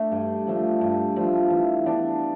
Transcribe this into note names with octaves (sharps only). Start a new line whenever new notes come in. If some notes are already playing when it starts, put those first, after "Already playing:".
Already playing: A3 D4
G2
F3 A3 D4
G2
F3 A3 D4
E3
B3 D4